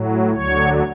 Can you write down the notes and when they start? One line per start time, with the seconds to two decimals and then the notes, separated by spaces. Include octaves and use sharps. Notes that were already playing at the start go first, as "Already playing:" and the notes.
Already playing: A2 F#3
0.33 D2 D3 F#3 C#5